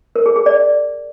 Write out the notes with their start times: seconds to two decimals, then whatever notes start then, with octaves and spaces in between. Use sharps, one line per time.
0.16 A#4
0.26 G#4
0.36 G#4
0.46 D5